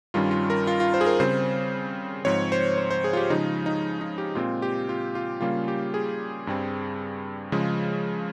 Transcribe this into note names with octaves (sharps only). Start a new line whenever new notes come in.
G2 D#3 G3 C#4 F4
F4
A#4
F4
F4
C5
G#4
A#4
C#3 G3 C4 C5
G#2 F3 C4 C#5
C5
C5
C5
G#4
F4
G4
C#3 F3 G#3 D#4
D#4
D#4
G4
A#2 G#3 C4 F4
G4
F4
F4
C#3 G3 A#3 C#4 F4
G4
G#4
G2 G3 C4
C#3 F3 G#3